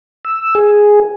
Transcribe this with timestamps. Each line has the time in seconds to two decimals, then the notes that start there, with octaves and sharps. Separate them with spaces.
0.25 E6
0.55 G#4